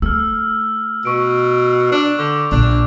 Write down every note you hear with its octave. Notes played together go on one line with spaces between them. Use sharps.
A3 E6 F6
B2 C#6 D7
D4
D3 D6 G6 F7
A#1 D4